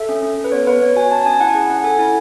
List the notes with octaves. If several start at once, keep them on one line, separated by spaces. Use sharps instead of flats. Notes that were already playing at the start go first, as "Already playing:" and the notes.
Already playing: A4 E5
C#4
C#4
A4
B4
B3 C#5
B3 B4
B3 C#5
F#4 G#5
C#4 A5
A5
C#4 G#5
E4 F#5
G#5
G#4 F#5
C#4 F#5
A4 G#5
E4 G#5